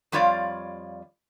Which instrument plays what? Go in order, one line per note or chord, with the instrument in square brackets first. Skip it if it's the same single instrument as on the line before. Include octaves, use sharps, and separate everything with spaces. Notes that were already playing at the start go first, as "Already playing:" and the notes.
[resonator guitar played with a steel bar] F2 G3 F4 C#5 D5 F5